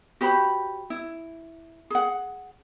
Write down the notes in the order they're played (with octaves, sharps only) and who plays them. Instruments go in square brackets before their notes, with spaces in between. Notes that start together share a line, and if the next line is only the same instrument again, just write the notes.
[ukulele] F#4 G4 C5 B5
E4
G#4 F#5